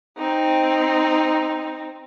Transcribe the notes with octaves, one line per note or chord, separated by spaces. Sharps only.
C4 D#4